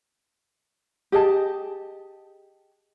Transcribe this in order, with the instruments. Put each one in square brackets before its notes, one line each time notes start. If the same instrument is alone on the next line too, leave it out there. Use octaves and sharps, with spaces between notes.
[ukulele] G4 G#4 D#5 A5